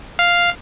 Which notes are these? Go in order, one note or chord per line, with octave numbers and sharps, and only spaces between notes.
F5